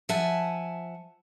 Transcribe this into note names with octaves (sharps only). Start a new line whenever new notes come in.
F3 E5 F#5 G#5 A5